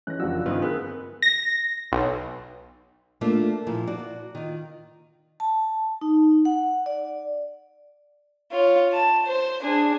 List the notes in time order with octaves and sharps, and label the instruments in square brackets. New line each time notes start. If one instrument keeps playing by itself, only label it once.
[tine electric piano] E3 G#3 C#4 [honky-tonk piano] F#6 A#6
[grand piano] F#1 F#2 F3 [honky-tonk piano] D4 F#4 [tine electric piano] E6
[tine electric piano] G2 [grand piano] D3 [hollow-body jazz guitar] D#3 F4 B4 [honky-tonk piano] C4 D#6
[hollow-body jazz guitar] B3 [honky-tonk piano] G#4 E6 F#6 [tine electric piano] A#4 B4
[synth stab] A#6
B1
[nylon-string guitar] A3 A#3 D4 F4
A#2 F3 E4
F#4 D5
D#3 F4
[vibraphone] A5
D#4
F#5
D5
[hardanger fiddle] F4 C#5
A5
C5
D4 G#4